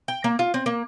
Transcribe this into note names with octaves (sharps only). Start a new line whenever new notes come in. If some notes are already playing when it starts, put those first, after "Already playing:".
G5
A#3
F4
C4
A#3